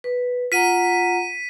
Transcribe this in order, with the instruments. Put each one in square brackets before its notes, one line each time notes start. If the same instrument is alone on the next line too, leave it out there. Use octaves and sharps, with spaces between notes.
[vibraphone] B4
[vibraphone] F4 F#5 A#5 [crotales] B6 D#7